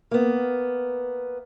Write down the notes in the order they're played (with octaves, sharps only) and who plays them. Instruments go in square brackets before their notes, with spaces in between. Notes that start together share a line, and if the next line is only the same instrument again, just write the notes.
[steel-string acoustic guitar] A#3 B3